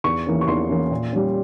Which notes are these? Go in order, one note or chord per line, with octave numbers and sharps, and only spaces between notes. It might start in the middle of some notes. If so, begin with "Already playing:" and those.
E2 C#6
E3 A#3 C#4
C#6
E2 C6
E3 A#3 C#4
A#2
G3 C#4